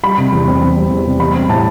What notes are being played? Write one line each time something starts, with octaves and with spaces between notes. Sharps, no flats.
G3 B5
C3
E2
C4
C4
G3
E2
C3
G3 B5
C4
A2 A5